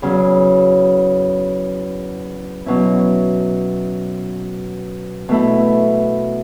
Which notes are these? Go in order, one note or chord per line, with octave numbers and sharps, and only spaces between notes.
E2 C#3 F#3
B2 F#3 C#4 E4
B2 A3 E4